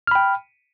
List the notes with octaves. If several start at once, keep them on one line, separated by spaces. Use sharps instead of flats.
G5 B5 F6